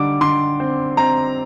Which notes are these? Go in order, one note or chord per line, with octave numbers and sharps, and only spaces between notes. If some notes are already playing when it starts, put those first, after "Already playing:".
Already playing: D3 G3 D6
D3 C6
C4
C4 A#5